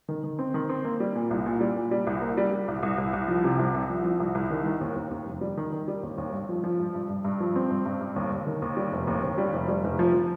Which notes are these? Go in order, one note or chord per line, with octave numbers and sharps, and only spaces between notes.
D#3
D#3
C4
D#3
C4
A#3
G3
A#2
C2
A#2
G3
A#2
G3
C2
A#3
G3
G3
C2
C2
C2
C2
F3
C3
C2
C2
F3
F3
C2
C2
D#3
D#3
D#2
D#2
D#2
F1
G3
D#3
D#3
G3
D#2
D#2
G2
F3
F3
G2
G2
G2
G2
F3
C4
G2
G2
G2
D#2
D#2
D#3
D#2
G3
F1
D#2
D#2
G3
F1
G3
F1
F3
F3